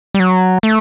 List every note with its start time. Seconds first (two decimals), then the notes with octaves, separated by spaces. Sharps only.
0.14 G3
0.20 F#3
0.63 A3